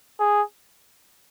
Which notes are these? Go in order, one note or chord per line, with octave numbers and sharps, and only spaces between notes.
G#4